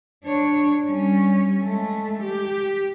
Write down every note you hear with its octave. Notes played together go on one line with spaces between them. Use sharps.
D4 C#5
G3 C#4
G#3 A3
G4